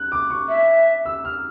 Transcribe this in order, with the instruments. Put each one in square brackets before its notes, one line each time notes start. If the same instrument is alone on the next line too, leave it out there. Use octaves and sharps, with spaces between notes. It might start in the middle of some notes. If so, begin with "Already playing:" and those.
Already playing: [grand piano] F#6
D6
C#6
[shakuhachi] E5
[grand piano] E6
F6